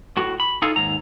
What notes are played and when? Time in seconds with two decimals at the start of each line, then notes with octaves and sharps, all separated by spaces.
0.17 A2 F#4
0.40 B5
0.62 D#4 F4 G#4 A4 F5
0.76 D#2 G#2 A#5